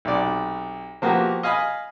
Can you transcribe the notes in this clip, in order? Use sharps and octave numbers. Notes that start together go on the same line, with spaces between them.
B1 C3 D5
F3 A#3 B3 F#4 G4
D#5 F5 G#5 B5